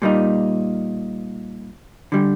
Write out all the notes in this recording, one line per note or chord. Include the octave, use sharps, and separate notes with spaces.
A#2 G3 A#3 D#4
D3 G3